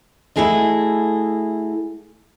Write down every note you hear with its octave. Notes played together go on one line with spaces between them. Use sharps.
A3 E4 F#4 G#4 A4 D#5